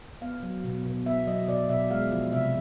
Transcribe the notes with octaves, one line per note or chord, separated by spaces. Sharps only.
B3 F5
F#3
B2
B2
B3 E5
F#3 D#5
B2 D5
B2 E5
G#3 F5
F3
C3 E5